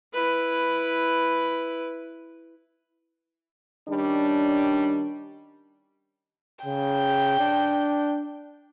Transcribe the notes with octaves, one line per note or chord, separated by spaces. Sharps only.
E4 B4
D#3 G3 C#4 D4
C#3 G5
D4